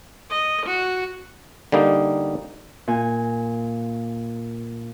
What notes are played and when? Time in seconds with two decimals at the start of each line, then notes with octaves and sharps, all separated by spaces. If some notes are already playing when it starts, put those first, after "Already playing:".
0.30 D#5
0.66 F#4
1.72 D3 G3 A#3 D#4
2.88 A#2 G#5